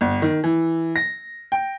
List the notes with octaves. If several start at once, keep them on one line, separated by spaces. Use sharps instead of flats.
G1
D#3
E3
A#6
G5